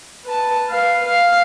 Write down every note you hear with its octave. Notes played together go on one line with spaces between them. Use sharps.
B4 A5
B4 F5
F5